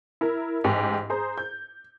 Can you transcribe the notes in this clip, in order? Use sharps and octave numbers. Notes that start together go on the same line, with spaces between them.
E4 A#4
A1 G#2 G4
G#4 C5 A#5
G6